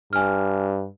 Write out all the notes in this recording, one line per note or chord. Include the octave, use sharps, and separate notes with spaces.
G2 G#5 F6